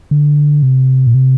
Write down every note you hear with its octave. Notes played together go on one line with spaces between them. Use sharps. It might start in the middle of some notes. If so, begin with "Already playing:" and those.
D3
C3
A#2
C3